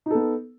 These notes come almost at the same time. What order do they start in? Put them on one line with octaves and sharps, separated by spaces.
D#4 A4 B3